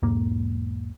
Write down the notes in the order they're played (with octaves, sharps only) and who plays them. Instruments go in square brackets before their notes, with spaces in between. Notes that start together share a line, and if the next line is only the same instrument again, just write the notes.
[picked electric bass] B1 E2 G#2 A#3